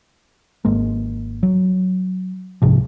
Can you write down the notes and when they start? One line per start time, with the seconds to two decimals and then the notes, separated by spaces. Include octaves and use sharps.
0.65 G#1 G#3 A#3
1.43 F#3
2.62 C2 G#2 C3 F3